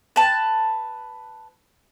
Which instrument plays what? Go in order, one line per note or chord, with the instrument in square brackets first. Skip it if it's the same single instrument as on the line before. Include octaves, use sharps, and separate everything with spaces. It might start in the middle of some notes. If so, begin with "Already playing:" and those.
[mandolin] B4 A5